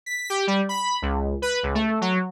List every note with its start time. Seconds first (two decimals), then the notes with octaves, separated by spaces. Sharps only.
0.06 B6
0.30 G4
0.47 G3
0.69 B5
1.02 C#2
1.42 B4
1.63 C#2
1.75 A3
2.01 F#3